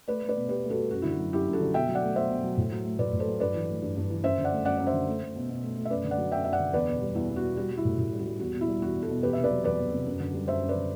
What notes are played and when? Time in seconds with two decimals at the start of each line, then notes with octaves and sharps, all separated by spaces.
0.08 A3 B4 D5
0.22 A3
0.29 B4 D5
0.35 B2
0.49 B2 G4 B4
0.64 A3
0.70 F#4 A4
0.77 A3
0.91 F#2 F#4
1.02 D3 E4
1.12 F#4
1.18 F#3
1.32 F#2 E4 G4
1.47 F#2
1.53 F#4 A4
1.61 D3
1.74 B2 E5 G5
1.88 F#3
1.95 D5 F#5
2.02 A3
2.16 B2 C5 E5
2.29 B2
2.43 F#3
2.57 A2
2.72 F#3
2.85 A3
2.98 A2 B4 D5
3.13 A2
3.20 A4 C5
3.27 F#3
3.40 G2 B4 D5
3.55 E3
3.69 A3
3.82 G2
3.97 G2
4.10 E3
4.24 F#2 C5 E5
4.38 D3
4.44 D5 F#5
4.51 A3
4.65 F#2 D5 F#5
4.78 F#2 D5
4.87 C5 E5
4.93 D3
5.07 A3
5.21 A3
5.35 B2
5.49 B2
5.62 A3
5.76 A3
5.85 E5
5.90 F#2 B4 D5
6.04 D3
6.11 D5 F#5
6.18 F#3
6.32 F#2 E5 G5
6.44 F#2 E5
6.52 D5 F#5
6.60 D3
6.73 E2 B4 D5
6.88 B2
7.01 G3
7.15 E2 E4
7.29 E2
7.36 F#4
7.43 B2
7.57 G3 F#4
7.71 G3
7.77 E4
7.85 A2
7.98 A2 E4
8.12 G3
8.19 F#4
8.27 G3
8.40 E2 F#4
8.54 B2
8.61 E4
8.68 G3
8.82 E2 F#4
8.95 E2
9.02 F#4 A4
9.09 B2
9.23 E2 G4 B4
9.33 C3 E5
9.44 B4 D5
9.51 F#3
9.64 E2 B4 D5
9.78 E2
9.92 C3
10.06 F#2
10.20 D3
10.34 G3
10.48 F#2 C5 E5
10.62 F#2
10.69 B4 D5
10.75 D3